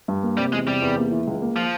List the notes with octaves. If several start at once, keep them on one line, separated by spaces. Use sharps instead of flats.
G2
A#3
C3 G3
E2 G#3
C3 G3
E2
A#3
E3
C#2
A#3
F3